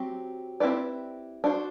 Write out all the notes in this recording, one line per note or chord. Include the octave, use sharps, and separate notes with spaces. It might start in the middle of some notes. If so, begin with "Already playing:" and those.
Already playing: F#3 C4 G4
C4 E4 G4 B4 D5
D4 F#4 C5